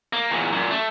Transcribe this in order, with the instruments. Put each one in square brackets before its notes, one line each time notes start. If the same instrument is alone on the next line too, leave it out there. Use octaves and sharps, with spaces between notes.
[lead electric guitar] A#3
E2 A#2
F#2 A#2
A3